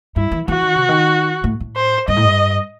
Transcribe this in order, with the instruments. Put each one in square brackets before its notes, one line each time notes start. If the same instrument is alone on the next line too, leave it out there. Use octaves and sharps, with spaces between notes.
[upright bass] G2 [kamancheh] E4
[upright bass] E3
[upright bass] E3 [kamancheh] F#4
[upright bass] D#3
C3
D#3
A2
A2
[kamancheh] C5
[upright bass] G2 [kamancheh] D#5
[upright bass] A2
G2